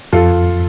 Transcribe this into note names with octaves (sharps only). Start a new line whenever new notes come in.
F2 F4 A4